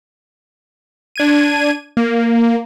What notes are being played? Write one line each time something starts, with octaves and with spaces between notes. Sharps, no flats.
D4 G#6 D#7
A#3